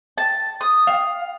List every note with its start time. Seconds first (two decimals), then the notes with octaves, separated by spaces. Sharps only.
0.18 A5
0.61 D#6
0.87 F5